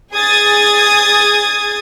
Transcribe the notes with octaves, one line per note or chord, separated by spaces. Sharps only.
G#4 G#5 D#6 G#6 A6